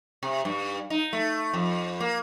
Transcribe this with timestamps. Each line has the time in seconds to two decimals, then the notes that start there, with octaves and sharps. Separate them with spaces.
0.23 C3
0.45 G2
0.90 D#4
1.13 A3
1.54 F2
2.00 A#3